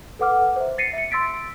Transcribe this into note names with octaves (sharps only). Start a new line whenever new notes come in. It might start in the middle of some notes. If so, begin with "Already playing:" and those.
A4 B4 F#5 D6 F6
C5 E5
A6 A#6 C7 C#7 D#7
E5 C#7
C6 E6 A6 B6 D7